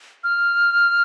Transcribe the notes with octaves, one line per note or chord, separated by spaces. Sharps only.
F6